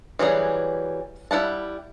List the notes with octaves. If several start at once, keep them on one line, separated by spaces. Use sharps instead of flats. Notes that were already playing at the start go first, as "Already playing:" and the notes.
E3 F#3 G3 G#4
G3 E4 F#5 A5